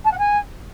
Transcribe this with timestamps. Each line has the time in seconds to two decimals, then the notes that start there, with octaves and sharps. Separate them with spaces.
0.04 A5
0.11 F#5
0.18 G#5